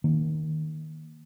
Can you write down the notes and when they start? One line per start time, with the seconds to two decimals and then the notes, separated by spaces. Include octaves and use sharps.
0.04 D#3 A#3